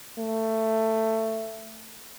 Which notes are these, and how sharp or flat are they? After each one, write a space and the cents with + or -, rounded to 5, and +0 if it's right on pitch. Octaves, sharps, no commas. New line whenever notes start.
A3 +15